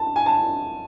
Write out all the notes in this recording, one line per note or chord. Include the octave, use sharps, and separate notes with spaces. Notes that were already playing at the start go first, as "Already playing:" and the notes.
Already playing: A5
G#5
A5